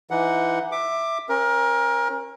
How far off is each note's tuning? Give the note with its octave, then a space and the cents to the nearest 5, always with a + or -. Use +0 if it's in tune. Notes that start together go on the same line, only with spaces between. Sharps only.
E3 +25 D#4 +25 F#5 +0
E5 +0 D6 +15
C#4 -35 A#4 +25